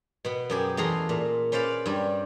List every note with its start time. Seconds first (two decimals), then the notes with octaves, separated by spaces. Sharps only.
0.25 B2 B3
0.50 F#2 G4 G#4
0.77 E2 A3 G#4 A#5 C6
1.09 A#2
1.52 C#4 B4 C5 D5 F5
1.86 G2 G3